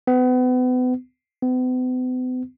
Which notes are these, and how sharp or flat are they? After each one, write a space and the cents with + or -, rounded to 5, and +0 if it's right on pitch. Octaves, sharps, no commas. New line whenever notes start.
B3 +35
B3 +45